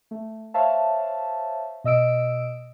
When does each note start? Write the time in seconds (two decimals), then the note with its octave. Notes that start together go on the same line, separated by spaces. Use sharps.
0.11 A3
0.54 C5 C#5 E5 F5 A5
1.84 B2 D#5 E6 D7